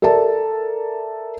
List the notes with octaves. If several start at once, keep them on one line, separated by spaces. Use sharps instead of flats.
A4 A#4 D5 E5 A5